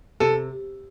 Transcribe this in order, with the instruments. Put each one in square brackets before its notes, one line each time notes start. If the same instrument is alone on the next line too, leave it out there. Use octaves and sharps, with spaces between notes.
[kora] C3 [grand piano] A4